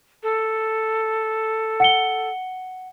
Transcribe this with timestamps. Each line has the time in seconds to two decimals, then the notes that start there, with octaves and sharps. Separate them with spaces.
0.23 A4
1.80 F#5 C#7 G7